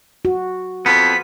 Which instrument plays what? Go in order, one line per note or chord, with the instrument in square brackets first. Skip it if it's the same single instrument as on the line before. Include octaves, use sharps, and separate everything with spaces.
[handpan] F#4
[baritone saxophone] F2 [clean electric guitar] B3 [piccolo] B6